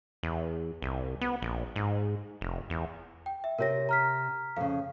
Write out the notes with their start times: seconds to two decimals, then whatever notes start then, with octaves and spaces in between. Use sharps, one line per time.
0.23 E2
0.82 C2
1.21 B3
1.42 A#1
1.76 G#2
2.41 F1
2.70 E2
3.26 G5
3.44 E5
3.58 C3 G4 A#4 C#5 A#6
3.89 A#5 F6 B6
4.56 F2 C#3 F5